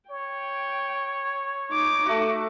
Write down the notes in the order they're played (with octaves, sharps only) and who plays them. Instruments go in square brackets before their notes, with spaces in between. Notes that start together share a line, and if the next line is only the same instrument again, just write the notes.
[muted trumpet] C#5 [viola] G5
[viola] D#4 D6
[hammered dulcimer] A3 F#4